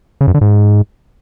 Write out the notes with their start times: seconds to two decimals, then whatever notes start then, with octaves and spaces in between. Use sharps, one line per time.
0.21 C#3
0.28 F#2
0.34 D3
0.41 G#2